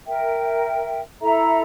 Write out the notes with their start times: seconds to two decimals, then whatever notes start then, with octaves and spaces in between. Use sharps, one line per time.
0.06 A#4 E5 G5
1.21 E4 A4 E5 A#5